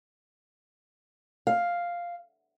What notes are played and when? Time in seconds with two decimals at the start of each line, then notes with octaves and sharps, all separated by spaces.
1.47 F5